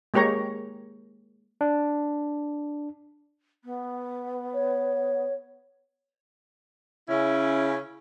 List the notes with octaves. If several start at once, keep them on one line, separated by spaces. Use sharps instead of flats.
G#3 A#3 G4 C#5 A#5
D4
B3
C#5
C#3 C#4 E4